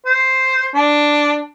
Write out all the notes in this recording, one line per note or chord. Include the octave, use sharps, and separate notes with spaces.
C5
D4